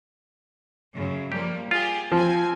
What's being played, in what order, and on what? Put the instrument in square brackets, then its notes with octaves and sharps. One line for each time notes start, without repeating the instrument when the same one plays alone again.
[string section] F#2 C#3
[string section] F3 G3 A#3 [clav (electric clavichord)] G4
[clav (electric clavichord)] F4 [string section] G4 G#4
[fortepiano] F3 [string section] C4 G#5